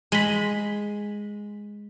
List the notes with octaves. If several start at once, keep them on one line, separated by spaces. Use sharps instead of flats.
G#3 B5